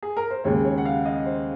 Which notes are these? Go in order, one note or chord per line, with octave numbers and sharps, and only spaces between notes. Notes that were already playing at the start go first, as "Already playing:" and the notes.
G#4
A#4
C5
D#2 C#3 G#3 C#5
C#5
F#5
F5
D#5
C5